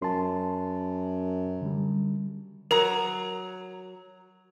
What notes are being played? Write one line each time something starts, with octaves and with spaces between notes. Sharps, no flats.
F#2 A5 C6
D3 G3
F#3 A#4 A#5